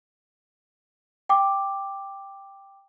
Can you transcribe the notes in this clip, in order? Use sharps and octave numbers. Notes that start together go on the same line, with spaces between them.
G5 D6